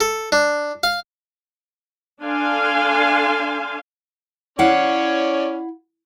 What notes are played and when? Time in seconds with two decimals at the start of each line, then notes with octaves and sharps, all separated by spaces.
0.01 A4
0.32 D4
0.83 F5
2.22 D4 A4 F5 G#5 C6
4.59 C#4 E4 C#5 D5 F5 F#5